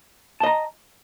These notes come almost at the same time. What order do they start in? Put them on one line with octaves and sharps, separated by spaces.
A5 D#5 A#5